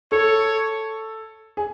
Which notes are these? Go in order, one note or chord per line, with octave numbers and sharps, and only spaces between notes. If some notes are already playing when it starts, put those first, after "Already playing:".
A4 C#5
G#4